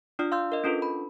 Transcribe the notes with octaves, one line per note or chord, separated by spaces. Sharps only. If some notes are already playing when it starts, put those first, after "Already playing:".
D4 F4 D5 F6
F5 C6 E6 G6
A#4 D#5
C#4 D4 F4 A4 B4
B5